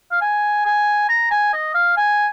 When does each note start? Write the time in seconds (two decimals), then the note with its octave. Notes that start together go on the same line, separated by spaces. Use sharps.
0.11 F5
0.21 G#5
0.65 G#5
1.09 A#5
1.31 G#5
1.53 D#5
1.74 F5
1.97 G#5